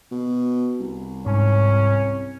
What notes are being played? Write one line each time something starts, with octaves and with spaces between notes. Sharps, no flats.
B2
C2
G#2 C#4